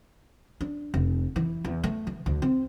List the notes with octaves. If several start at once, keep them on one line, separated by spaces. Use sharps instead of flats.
D4
F1
E3
E2
A3
E3
D2
C4